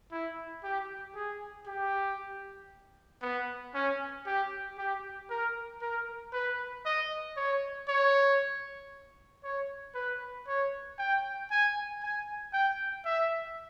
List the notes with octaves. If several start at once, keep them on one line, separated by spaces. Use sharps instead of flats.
E4
G4
G#4
G4
B3
C#4
G4
G4
A#4
A#4
B4
D#5
C#5
C#5
C#5
B4
C#5
G5
G#5
G#5
G5
E5